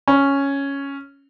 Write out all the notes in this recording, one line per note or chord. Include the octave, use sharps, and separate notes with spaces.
C#4